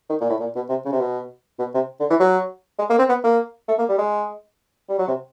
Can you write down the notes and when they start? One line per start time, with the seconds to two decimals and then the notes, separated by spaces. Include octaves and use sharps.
0.10 D#3
0.21 A#2
0.30 A2
0.40 A#2
0.56 B2
0.69 C3
0.86 C#3
0.92 C3
1.00 B2
1.59 B2
1.75 C3
2.00 D3
2.10 E3
2.20 F#3
2.79 G#3
2.90 A#3
2.99 C4
3.09 B3
3.24 A#3
3.68 A3
3.78 A#3
3.89 G3
3.98 G#3
4.89 G3
4.99 F#3
5.08 C3